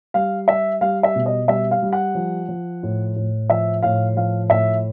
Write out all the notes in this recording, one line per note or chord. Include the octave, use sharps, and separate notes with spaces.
G3 F5
G3 E5
G3 F5
E5
B2
D#5
G3 E5
F5
G3
F#5
F3
F3
A2
A2
F3 E5
A2 F5
F3 F5
A2 E5